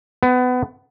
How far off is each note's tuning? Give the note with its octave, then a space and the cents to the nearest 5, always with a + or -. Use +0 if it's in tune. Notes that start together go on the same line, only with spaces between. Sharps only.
B3 +25